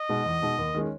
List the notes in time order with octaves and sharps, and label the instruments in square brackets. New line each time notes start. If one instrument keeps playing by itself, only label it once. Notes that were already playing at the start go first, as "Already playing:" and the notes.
Already playing: [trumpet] D#5
[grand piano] B2 G#3 D#4
E2
B2 G#3 D#4
D#2
D#3 G#3 C#4